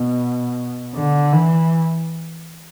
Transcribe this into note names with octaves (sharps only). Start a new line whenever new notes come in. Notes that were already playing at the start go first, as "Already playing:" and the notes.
Already playing: B2
D3
E3